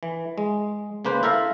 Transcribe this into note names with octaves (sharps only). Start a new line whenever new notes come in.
E3
G#3
C#3 A#3 B4 C5
E4 A4 A#4 E5 F5